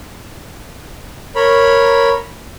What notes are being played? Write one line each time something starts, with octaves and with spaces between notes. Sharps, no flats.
A#4 C#5 B5